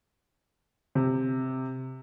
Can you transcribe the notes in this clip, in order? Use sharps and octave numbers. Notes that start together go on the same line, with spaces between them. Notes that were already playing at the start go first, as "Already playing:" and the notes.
C3